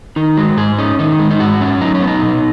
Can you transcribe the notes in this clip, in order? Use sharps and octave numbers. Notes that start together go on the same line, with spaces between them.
D#3 D#4
G#3 F#4
G#2 G#4
C#4 D#4
D#3 D#4
G#3
D#4
G#2 F#4
C#4
F#3 D#4
C#4
B3
D#4
B2